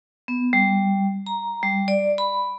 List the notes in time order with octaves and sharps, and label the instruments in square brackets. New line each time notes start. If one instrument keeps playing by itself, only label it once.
[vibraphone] B3
G3
A#5
G3
D5
B5